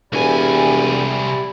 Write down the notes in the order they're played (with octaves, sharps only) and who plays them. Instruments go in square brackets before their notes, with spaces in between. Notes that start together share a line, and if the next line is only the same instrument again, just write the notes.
[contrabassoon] E1 [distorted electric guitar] C2 G#5 [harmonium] E4 G4 D5